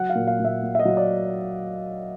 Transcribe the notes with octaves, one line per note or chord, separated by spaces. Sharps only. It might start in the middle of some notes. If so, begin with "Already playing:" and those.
Already playing: F#3 F#5
F5
A#2
F5
A#2 E5
A#3
E5
D#5
F#3
D5